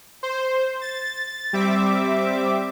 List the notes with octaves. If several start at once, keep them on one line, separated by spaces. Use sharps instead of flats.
C5
A6
G3 C4 E5 D6